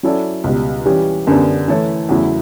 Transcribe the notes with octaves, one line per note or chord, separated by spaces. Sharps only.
F#3 C#4 E4 A4 D5
C#2 B2 G3
E3 G3 C#4 G4
F#2 D3 G3 B3 D4
E3 A3 E4 A4 C#5
E2 C#3 F#3 A3 E4